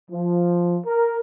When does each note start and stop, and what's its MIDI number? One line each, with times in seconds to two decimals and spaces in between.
0.11 0.77 53
0.86 1.19 70